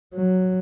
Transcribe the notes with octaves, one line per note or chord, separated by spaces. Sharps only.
F#3